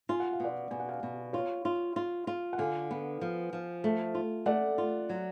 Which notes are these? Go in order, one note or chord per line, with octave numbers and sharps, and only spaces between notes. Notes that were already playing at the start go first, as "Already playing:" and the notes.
F4 G#5
F#5
F5
B2 D5 F#5
B2 G#5
F#5
F5 G#5
B2
F4 C#5 F5
F4
F4
F4
F#5
D3 F5 G#5
B3
F3
F3
A3
F4
A3 D5 F#5
F4
F#3